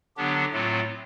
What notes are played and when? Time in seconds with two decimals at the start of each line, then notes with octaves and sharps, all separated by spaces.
0.17 D3 F#3 B3 D4 G4
0.52 A2 F#3 A3 C4 F4